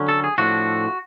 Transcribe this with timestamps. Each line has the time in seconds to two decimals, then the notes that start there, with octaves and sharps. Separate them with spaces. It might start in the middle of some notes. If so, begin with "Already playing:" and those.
Already playing: D3 F#3 C#4
0.08 A4
0.24 G#4
0.38 A2 F3 A3 D4 F#4